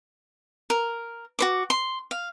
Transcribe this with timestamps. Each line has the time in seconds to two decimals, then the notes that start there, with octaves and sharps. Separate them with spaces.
0.70 A#4
1.39 F#4 C5 D6
1.70 C6
2.11 F5